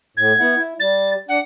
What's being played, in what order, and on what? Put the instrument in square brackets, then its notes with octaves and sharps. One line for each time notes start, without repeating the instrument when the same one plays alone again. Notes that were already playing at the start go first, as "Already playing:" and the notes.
[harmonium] A2 [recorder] G#6
[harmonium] B3 E4 F#5
E4
[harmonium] G3 [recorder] A6
[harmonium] D4 [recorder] F#5